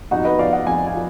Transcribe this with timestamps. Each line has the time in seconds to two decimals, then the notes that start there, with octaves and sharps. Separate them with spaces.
0.11 F2 D#4 F#4
0.25 B4 D#5
0.39 F3 D5 F5
0.53 D#5 F#5
0.67 F2 G#5
0.87 F5 G#5
0.95 F3